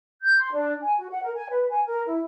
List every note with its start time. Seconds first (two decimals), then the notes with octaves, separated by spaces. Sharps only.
0.22 G6
0.39 C6
0.53 D4
0.82 G#5
0.99 F#4
1.11 F#5
1.23 A#4
1.35 G#5
1.49 B4
1.70 G#5
1.86 A#4
2.07 E4